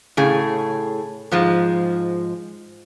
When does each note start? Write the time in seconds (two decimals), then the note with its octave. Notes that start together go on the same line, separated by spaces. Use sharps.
0.17 A2 C#3 G#4
1.32 G#2 F3 G#3